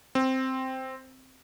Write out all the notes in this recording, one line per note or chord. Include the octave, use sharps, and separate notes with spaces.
C4